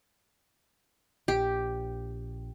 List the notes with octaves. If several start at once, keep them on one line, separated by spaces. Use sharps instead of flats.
A#1 G4